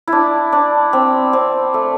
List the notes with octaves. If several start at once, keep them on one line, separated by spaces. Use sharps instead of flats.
D4 E4
D4
C4
C4
A3